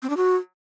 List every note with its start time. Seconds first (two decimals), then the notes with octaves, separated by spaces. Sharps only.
0.03 C4
0.10 D4
0.17 F#4